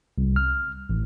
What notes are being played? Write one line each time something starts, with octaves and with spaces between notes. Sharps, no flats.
C2
F6
A1